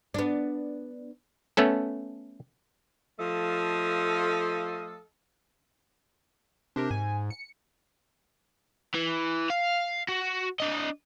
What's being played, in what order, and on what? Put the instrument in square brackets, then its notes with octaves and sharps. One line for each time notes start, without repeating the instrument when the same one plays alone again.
[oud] B3 D4
[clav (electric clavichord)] A3 B3 C#4 A4
[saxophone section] F3 A3 A4 D#5 F5
[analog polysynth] C3 G4 A#4 [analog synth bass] D4
[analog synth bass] G#2 [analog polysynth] G#5
[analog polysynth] C#7
[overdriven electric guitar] E3
F5
F#4
D4 D#5